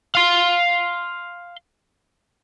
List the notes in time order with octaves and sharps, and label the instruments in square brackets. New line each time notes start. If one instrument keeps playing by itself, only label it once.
[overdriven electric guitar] F5 C6